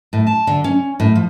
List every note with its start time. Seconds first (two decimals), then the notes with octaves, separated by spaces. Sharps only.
0.13 A2
0.27 A5
0.47 D3
0.64 C#4
1.00 A2
1.15 F3